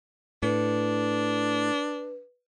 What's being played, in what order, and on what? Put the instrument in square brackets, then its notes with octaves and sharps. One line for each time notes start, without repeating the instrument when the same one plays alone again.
[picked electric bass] A2 [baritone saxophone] D4 [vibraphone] B4